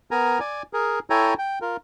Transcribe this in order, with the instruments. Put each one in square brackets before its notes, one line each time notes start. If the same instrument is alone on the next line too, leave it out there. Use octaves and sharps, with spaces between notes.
[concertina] B3 A#4 G#5 A#5
D5 G#5
G#4 A#4
E4 A4 C#5 G5 G#5 A#5
G5
F4 A#4